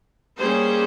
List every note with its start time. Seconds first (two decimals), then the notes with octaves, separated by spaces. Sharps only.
0.39 G3 A#3 C#4 G#4 C5